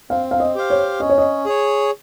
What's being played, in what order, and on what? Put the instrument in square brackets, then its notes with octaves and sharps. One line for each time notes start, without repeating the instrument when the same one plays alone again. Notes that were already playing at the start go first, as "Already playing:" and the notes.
[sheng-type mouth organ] C4 [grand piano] F5
[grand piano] F5
D#5
[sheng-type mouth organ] G4 C5 F5
[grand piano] C#5
[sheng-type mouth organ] C#4 [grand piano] D#5
[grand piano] C#5
D#5
[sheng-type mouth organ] G#4 C#5